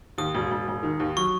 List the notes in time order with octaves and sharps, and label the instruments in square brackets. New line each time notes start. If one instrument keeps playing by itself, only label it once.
[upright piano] D#2 [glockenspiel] D#6
[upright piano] E1
E1
E1
D#3
D#2
[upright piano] F#3 [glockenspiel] C#6